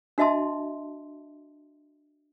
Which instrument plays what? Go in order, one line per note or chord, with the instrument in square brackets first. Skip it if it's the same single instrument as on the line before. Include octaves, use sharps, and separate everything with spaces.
[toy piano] D4 F#4 D#5 E5 A5 C6